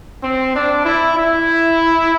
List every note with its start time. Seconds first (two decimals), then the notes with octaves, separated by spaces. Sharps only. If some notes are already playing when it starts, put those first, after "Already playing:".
0.24 C4
0.55 D4
0.86 E4
1.16 E4